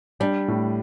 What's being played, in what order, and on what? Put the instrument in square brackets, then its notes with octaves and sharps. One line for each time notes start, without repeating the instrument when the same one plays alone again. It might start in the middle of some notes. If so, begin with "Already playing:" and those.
[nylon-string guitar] G3 [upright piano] D4
[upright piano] A2